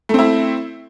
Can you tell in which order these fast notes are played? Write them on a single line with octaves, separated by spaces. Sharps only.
A3 C4 E4